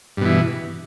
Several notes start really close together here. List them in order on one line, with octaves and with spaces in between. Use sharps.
G2 B2 E3